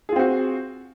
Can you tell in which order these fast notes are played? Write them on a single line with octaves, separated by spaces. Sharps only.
G#4 F4 C4 F#4